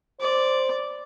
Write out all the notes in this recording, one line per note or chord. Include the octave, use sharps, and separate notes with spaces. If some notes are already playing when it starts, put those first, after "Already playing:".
C5 D5